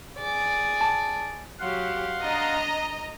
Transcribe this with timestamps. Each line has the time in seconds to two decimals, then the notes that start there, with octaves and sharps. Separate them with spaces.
0.17 G#4 D5
0.81 A5
1.60 F#3 G4 F5 F#5 C6
2.21 D4 D#5 A#5